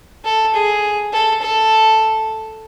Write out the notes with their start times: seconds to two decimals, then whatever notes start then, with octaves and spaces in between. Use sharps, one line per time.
0.25 A4
0.54 G#4
1.12 A4
1.42 A4